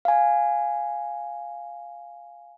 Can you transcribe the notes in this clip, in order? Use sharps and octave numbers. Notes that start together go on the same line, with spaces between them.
F5 G#5